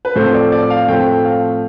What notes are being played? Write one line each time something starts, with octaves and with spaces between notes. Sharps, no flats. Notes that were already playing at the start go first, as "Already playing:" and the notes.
B4
A2 F3 A3 C4 C5
D5
D5
F5
A2 F3 A3 C4 G5
F5